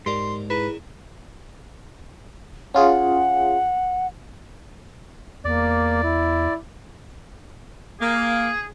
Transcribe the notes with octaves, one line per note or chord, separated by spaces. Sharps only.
G#2 G4 A#4 D5 C6
E4 G#4 B4 A#5
C#4 F4 G#4 F#5
E2 A#3 D5
E4
A#3 G#4